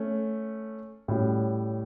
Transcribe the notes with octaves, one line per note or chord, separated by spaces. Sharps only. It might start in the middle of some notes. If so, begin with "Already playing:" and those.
Already playing: A3 C#4
A2 G3 C#4 F#4